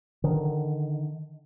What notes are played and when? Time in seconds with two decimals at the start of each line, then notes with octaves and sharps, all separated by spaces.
0.24 D3 D#3